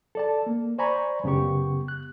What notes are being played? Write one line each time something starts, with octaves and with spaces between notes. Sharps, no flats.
A4 D5 A5
A#3
C5 D5 G#5 A#5 B5 C#6
F#2 C#3 B3 G4 C#6
F#6